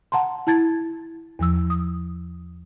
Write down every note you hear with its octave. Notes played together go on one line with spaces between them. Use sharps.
F#5 A5 A#5 C6
E4 A5 G#6 A6
E2 F3 E6
D#6